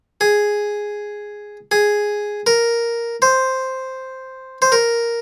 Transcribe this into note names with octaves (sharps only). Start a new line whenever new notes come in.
G#4
G#4
A#4
C5
C5
A#4